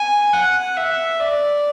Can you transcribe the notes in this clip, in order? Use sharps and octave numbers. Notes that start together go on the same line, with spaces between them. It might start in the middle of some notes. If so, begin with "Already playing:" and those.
Already playing: G#5
F#5
E5
D5